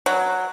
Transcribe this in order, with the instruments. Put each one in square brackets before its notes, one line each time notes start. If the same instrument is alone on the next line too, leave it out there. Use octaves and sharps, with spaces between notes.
[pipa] F#3